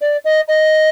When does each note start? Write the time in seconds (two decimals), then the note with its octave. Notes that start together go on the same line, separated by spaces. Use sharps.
0.01 D5
0.24 D#5
0.48 D#5